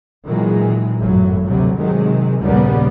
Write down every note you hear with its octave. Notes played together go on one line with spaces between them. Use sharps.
A#2 D#3 E3 F#3 G#3
G#1 F#2 A2 F#3
D2 C3 F#3 G3
C3 D#3 F#3 G#3
A#1 D#2 C#3 G3 A#3 B3